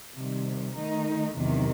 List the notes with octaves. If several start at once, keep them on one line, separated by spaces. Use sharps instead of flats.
C3 D#3 G3
D#3 A3 D#4
E2 C3 D#3 F#3